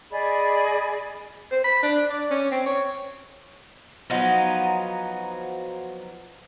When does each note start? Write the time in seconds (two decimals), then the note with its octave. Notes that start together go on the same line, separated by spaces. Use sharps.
0.11 G#4 D5 D#5 B5
1.51 C5
1.64 B5
1.83 D4
2.10 D5
2.31 C#4
2.51 C4
2.66 C#5
4.10 F3 F#3 B3 D#4